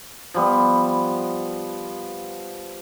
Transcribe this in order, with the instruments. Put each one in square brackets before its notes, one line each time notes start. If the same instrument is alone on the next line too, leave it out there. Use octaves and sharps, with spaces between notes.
[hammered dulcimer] F3 G3 B3